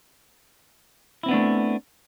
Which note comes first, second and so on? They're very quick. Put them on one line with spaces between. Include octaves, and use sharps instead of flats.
E4 C4 B3 D4 A3